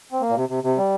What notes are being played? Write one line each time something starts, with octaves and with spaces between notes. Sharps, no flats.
C4
A#3
A#2
C3
C3
C3
G3